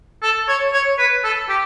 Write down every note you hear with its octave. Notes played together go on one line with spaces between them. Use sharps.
A4
C#5
C#5
B4
A4
G4